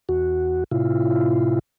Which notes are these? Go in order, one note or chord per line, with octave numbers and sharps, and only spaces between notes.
E2 F#4
A2 C3 E4 F4